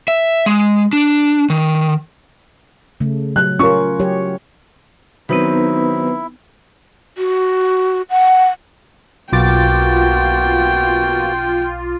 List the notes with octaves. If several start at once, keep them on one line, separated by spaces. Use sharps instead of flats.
E5
G#3
D4
D#3
C#3 A3
F#3 F#6
C#4 F4 A#4 C#6
F#3 G4 C#5
D#3 F#3 B3 C4 D#4 E4 B4
F#4
F#5
B1 A#3 B3 F4 F#4 G5 D6 A6